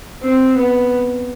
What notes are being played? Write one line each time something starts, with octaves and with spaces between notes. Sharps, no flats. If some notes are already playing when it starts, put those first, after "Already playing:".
C4
B3